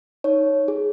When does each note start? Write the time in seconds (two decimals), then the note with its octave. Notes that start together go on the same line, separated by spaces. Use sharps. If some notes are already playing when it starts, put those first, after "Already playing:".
0.24 D#4 C#5
0.68 G#4